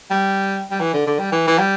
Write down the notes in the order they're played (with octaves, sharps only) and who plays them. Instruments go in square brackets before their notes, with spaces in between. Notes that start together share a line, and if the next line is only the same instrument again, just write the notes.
[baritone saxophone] G3
G3
E3
D3
D3
G3
E3
E3
G3